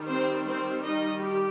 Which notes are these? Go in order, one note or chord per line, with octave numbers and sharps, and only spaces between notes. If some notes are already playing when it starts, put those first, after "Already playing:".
Already playing: D#3 G3
C4 C5
C4 C5
D#4 D#5
G4